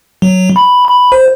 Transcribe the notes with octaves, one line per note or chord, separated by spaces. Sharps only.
F#3
B5
B5
C5